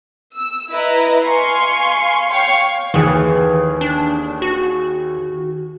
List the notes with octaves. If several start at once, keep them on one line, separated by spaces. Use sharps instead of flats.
E6
E4 B4 D#5 A#5
F5 G#5 C6 C#6
C#5 F5 G5 C#6
D#2 E3 G#4
D4
F#4